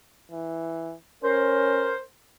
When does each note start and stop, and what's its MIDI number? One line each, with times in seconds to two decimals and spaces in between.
0.31 0.93 52
1.24 1.94 61
1.24 1.97 70
1.24 1.97 72